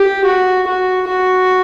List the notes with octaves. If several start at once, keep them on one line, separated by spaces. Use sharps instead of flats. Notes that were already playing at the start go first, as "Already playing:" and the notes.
Already playing: G4
F#4
F#4
F#4